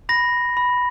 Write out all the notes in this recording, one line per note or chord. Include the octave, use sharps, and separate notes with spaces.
B5 A#6
B5